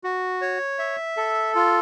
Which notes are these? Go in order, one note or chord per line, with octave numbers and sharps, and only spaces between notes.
F#4
C#5
E5
A4
F4